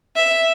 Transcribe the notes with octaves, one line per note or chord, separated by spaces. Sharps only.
E5